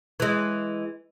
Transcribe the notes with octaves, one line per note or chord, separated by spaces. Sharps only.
E3 G#3